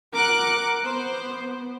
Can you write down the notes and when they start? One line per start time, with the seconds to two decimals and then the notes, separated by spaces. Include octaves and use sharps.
0.13 A#4 F#5 D6 F#6
0.84 B3 C5